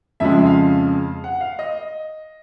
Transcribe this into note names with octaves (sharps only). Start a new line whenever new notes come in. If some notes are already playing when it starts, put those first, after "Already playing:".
F2 C#3 F3 G#3 E5
F5
F#5
F5
D#5